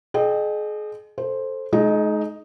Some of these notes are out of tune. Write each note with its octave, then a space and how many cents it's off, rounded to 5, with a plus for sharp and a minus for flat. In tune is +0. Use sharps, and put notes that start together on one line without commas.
G#4 +35 D#5 -35 G5 +0
A4 +0 C5 +10
G#3 +40 D#4 +0 D#5 +0